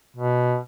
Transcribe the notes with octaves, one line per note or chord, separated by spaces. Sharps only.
B2